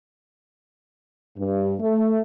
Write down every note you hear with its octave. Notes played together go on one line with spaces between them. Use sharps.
G2
A3